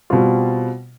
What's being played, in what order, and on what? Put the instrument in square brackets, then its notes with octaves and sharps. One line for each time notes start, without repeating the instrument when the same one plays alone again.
[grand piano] B2 G3 C4 F4